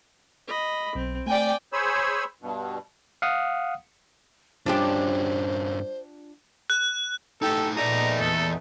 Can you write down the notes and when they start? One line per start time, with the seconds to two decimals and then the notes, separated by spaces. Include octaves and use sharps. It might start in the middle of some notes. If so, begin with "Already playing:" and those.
0.47 D#5 B5
0.95 B1 C4
1.26 A3 D5 G5 G#5
1.73 G#4 C5 C#5 G#5 B5 E6
2.42 G2 B2
3.22 F5 F#5 D#6
4.66 G2 C#4 D4 F4 G4 C5
6.70 F#6
7.42 A2 D#4 G4 A4
7.77 A#2 A3 B3 D#4 G#4 D5 A#5
8.19 E2 A4